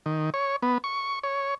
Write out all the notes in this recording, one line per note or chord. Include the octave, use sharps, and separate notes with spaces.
D#3
C#5
B3
C#6
C#5